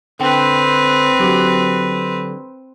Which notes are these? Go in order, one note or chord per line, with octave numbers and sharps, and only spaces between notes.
D3 C4 B4 G5
D3 F#3 G4